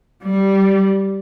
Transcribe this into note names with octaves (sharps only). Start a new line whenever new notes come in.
G3